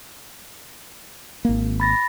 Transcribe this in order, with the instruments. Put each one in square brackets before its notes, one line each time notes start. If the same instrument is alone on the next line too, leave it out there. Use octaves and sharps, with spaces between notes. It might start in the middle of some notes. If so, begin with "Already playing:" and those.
[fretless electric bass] G#1 A#3
[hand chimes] B5 A6 A#6